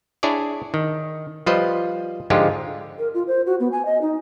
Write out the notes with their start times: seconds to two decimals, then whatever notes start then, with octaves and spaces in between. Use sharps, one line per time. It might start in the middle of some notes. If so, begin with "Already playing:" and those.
0.23 D4 E4 G#4 C#5 D5
0.74 D#3
1.46 F3 G3 F4 B4 C5 D#5
2.30 G#2 D3 F3 G#3 F4 G4
2.99 A#4
3.14 F4
3.27 C5
3.46 F#4
3.60 B3
3.72 G#5
3.85 D#5
4.02 D#4